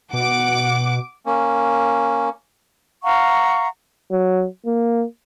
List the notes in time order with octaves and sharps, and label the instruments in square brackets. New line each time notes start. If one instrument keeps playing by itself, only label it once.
[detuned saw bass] B2 [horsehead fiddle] F#5 [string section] D6
[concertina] A#3 C#4
[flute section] F5 F#5 A#5 C#6
[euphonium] F#3
A#3